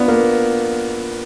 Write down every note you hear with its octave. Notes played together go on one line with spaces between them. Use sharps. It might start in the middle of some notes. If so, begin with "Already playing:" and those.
Already playing: B3 D4 F4
A#3